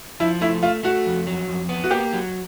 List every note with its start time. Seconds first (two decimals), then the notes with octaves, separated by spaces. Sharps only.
0.20 F3 E4
0.41 A3 E4
0.63 A3 F4
0.83 A3 F#4
1.06 F2
1.27 F#3
1.48 F2
1.69 B3
1.84 F#4
1.91 A#3 G4
2.13 F#3